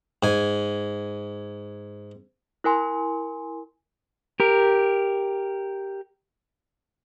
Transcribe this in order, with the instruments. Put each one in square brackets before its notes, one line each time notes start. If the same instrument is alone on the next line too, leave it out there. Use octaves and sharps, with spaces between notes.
[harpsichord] G#2 G#5
[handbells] E4 A#4 G#5 C6
[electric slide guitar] G4 A#4